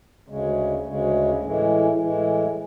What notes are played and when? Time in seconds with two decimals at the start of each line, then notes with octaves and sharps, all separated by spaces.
0.28 D2 C#3 G#3
0.86 D2 C#3 G#3
1.42 A2 E3 G#3
2.00 A2 E3 G#3